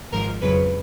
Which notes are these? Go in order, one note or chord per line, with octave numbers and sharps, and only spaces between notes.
G#1 G#2 F3 A#4
F2 C#3 F#3 B4